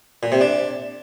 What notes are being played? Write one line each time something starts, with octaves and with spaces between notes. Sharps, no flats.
A#2
C3
D4